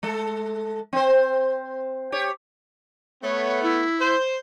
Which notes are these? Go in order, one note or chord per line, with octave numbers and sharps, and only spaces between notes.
G#3 A4
C4 C5
G4 C#5
A3 B3 C#5
E4
C5